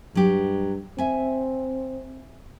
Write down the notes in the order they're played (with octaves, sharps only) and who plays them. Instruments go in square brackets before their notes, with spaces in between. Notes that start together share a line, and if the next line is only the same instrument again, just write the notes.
[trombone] G2 [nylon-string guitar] F#3 G4
[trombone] C4 [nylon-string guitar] E5 G#5